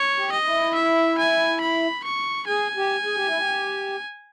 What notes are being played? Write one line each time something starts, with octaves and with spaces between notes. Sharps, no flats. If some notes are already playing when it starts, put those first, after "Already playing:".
Already playing: C#5
G4
D#5
E4
E5
G#5
B5
C#6
G#4 G#5
G4
G#4
G4
E4
G4